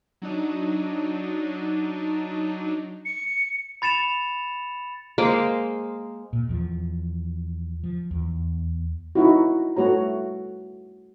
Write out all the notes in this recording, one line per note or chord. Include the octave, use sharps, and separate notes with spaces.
F#3 D4 D#4
C#7
B5 A6 C#7 E7 F7
G#3 A#3 C5 D6
A#2
E2 F3
F3
E2
D#4 E4 F#4
G3 A3 F#4 C#5 A#5